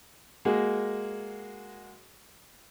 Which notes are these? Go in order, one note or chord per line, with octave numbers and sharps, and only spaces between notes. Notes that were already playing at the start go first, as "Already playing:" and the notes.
G#3 A#3 F#4 G#4